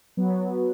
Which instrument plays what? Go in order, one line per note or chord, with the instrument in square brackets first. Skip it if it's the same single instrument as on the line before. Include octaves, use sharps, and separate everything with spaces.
[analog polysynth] F#3 B3